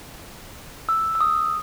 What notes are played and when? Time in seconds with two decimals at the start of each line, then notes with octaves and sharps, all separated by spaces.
0.89 E6
1.15 E6
1.20 D#6